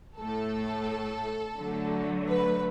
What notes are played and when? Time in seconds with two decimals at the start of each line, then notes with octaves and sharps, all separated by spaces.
0.19 A2 A3 A4
1.58 D3 F#3 A3
2.28 B4